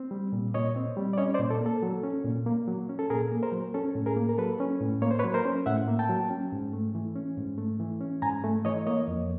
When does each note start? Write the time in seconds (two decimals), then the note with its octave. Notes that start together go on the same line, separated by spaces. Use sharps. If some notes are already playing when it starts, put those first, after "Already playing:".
Already playing: C4
0.11 G3
0.33 A#2
0.54 A#2 C#5 D#5
0.76 C4
0.97 G3
1.13 D5
1.18 C#4 C#5 D#5
1.34 C5 D5
1.39 A#2
1.50 A4
1.61 A#3 A4
1.83 F#3
2.03 C#4
2.25 A#2
2.46 A#3
2.68 F#3
2.89 C#4
2.99 A4
3.10 A#2 G#4 A#4
3.32 A#3
3.43 A#4 C5
3.52 F#3
3.74 C#4 A4
3.95 A2
4.06 G#4 A#4
4.16 A#3
4.29 A#4
4.38 F#3 A4 B4
4.60 C#4
4.81 A2
5.02 A#3 C#5
5.11 C5
5.19 B4 C#5
5.24 F#3
5.34 A#4 C5
5.45 C#4
5.66 A2 E5 F#5
5.88 A#3
5.99 G5 A5
6.09 F#3
6.30 C#4
6.52 G#2
6.73 A3
6.95 E3
7.15 C#4
7.37 G#2
7.58 A3
7.80 E3
8.01 C#4
8.22 G#2 G#5 A#5
8.44 A3
8.65 E3 C#5 D#5
8.87 A#3 C#5 D#5
9.08 F2